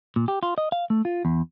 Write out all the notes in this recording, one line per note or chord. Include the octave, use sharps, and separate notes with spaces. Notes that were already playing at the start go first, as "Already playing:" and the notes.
A#2
G4
F4
D#5
F5
A3
F4
E2